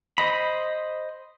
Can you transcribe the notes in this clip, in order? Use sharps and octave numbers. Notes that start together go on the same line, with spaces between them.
C5 D#5 B5